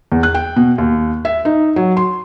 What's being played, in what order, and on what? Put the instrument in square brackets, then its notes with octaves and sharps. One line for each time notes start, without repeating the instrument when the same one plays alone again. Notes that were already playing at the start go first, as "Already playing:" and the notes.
[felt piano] E2
F#6
G5
B2
D#2
E5
D#4
F#3
C6